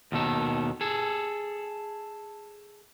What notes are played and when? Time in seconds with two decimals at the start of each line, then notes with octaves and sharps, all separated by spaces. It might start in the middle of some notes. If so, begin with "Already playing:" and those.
0.12 D#2 B2 D#3 A4
0.81 G#4 A4